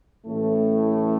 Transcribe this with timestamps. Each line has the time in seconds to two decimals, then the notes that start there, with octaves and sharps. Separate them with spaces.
0.25 A1 A2 A3